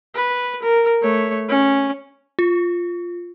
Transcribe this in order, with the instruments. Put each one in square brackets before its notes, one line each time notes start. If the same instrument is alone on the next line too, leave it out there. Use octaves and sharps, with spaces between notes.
[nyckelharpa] B4
A#4
A3 C#5
C#4
[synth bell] F4